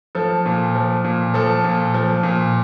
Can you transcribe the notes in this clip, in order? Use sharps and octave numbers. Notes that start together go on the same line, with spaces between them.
F3 A4
A#2
F3
A#2
F3 A4
A#2
F3
A#2